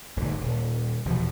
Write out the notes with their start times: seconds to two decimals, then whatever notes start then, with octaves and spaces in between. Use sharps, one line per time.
0.16 D1 G1 G#2 D3
0.41 D#1
1.05 F1 E2 B2 F3